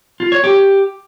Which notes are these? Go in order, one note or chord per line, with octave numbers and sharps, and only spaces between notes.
F4
C#5
G4